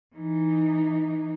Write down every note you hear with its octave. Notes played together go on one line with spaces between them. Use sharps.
E3 D#4